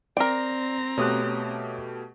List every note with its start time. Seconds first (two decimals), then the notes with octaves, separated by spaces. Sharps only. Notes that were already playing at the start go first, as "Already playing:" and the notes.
0.17 C4 A#4 D5 G5 A#5
0.98 B2 A3 G4 C#5 D#6 F#6